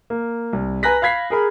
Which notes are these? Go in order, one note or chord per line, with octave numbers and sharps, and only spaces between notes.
A#3
C2
B4 G#5 A#5 F#6 A#6 B6
F5 B5 G#6 B6 C7
G#4 A#4 B5